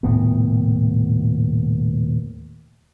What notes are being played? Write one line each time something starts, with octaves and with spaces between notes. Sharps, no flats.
D#1 A2 C3 B3